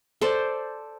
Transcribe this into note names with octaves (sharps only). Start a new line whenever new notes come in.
A4 C5 D5